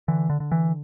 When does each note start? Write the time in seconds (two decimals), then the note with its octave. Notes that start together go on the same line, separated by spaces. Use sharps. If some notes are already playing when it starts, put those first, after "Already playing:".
0.08 D3 E3
0.30 D3
0.40 D3
0.52 E3